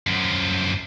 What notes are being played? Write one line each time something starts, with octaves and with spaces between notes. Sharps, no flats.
F#2 F3